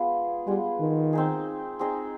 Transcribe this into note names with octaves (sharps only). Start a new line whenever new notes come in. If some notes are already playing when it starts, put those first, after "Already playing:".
Already playing: G#3 B3 F4 G#4
G3 G#3 B3 F4 G#4
D#3
C4 D#4 G#4
C4 D#4 G#4